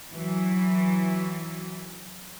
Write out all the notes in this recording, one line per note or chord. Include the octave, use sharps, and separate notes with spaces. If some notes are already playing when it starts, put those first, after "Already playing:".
E3 F#3